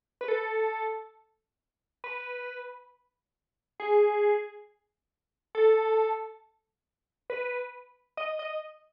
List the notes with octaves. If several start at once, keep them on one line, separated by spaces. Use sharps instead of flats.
B4
A4
B4
G#4
A4
B4
D#5
D#5